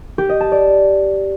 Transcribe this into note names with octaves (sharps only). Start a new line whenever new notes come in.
G4
D#5
A5
D5